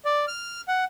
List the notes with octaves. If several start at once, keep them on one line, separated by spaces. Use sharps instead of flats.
D5
F6
F#5